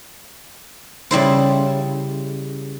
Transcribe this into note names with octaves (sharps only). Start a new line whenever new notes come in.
C#3 G3 E4 C5